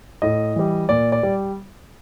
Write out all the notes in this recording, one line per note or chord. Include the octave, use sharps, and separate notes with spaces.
A2 D#5
E3 G3
A#2 D5
D5
G3